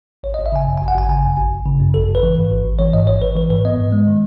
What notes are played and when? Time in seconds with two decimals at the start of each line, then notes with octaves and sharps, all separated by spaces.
0.23 G#1 C#5
0.34 D#5
0.38 G#1
0.46 E5
0.52 C#3 G#5
0.67 F#2
0.78 G#5
0.81 G#1
0.88 F#5
0.95 G#1 G#5
1.09 C#3 G#5
1.23 F#2
1.37 G#1
1.52 G#1
1.66 C#3
1.80 F#2
1.94 G#1 A4
2.08 G#1
2.15 B4
2.23 E3
2.37 G#2
2.51 G#1
2.65 G#1
2.79 E3 C#5
2.93 G#2 D#5
3.07 G#1 C#5
3.21 G#1 B4
3.36 E3 B4
3.50 G#2 B4
3.65 B3 D#5
3.78 G#2
3.92 G#3
4.07 D#3